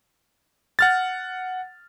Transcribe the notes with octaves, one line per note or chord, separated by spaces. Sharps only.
F#5 F6 A6